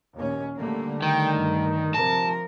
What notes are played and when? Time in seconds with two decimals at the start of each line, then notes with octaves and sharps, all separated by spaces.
0.14 D#2 A#2 C#4
0.57 D3 G3 A3 A#3
1.02 D#3 G5
1.38 G2
1.94 C3 F3 A#4 A5